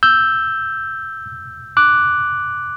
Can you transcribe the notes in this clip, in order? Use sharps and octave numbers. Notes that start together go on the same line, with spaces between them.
E6 G6
D6 F#6